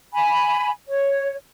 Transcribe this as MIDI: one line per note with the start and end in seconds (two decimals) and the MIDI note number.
0.14 0.70 80
0.14 0.70 83
0.88 1.35 73